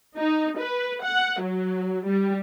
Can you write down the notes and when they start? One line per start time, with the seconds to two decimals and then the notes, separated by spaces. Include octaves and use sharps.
0.16 D#4
0.58 B4
1.02 F#5
1.40 F#3
2.06 G3